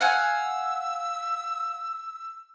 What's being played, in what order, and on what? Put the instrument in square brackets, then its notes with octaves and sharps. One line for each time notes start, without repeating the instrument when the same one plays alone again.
[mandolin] F5 F#5 G#5 [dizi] E6